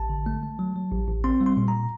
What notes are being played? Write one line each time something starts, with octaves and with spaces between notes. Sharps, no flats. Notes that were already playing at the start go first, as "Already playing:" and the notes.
Already playing: A1 A5
D3
A3
A3
F#3
F#3
A1
A1
C4 C6
G3
C6
A#2
A#5